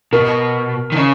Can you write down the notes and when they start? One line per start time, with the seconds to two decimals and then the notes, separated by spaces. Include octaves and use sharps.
0.13 B2 A#4
0.92 D#3
0.96 C#3